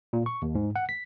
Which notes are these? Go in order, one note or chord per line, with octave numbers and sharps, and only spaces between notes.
A#2
C#6
D#2
G#2
F#5
B6